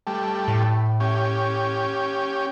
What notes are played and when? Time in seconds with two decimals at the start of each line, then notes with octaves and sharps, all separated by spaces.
0.07 G3 A3
0.48 A2
1.00 C#4 G4